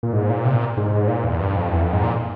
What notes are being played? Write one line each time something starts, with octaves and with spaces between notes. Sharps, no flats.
A#2
G#2
A#2
C3
A#2
G#2
A#2
E2
G2
F2
E2
F2
G#2
A#2